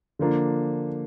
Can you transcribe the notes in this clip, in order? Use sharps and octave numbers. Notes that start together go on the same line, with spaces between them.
D3 F3 A#3 D4